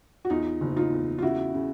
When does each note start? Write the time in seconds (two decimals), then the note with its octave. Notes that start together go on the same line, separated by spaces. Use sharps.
0.25 F#4
0.30 E2 D#4 F4
0.61 F#1
0.76 D#4 F4
0.92 E2
1.19 F4
1.22 C#3 E4 F#4
1.54 C#3